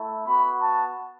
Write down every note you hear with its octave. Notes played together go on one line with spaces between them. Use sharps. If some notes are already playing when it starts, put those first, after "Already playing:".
Already playing: A3 E4
B3 F#4 B5
A5